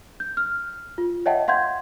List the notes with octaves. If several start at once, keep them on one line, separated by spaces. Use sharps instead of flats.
G6
F6
F4
C#5 D#5 E5 F#5 G5 A5
F5 F#5 C6 G6 G#6